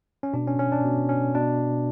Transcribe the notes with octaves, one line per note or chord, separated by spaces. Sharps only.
C#4
B2 D4
C#4
C#4
D4
B2
C#4
B2 D4